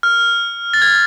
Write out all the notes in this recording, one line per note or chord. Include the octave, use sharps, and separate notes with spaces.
F6
A6
G#6